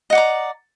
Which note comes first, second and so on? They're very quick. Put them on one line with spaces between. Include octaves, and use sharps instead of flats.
D#5 F#5 D5 A#5